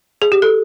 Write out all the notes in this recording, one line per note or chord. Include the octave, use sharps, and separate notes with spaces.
G#4
G4
A4